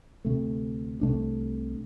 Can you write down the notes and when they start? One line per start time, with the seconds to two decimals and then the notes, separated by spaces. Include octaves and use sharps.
0.25 D2 C3 A3
1.01 C2 C3 A3 D4